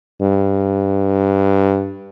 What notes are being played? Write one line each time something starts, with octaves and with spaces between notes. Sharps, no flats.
G2